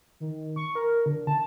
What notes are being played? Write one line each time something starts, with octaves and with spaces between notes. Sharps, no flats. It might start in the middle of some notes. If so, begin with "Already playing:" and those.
D#3
C#6
A#4
D3
A5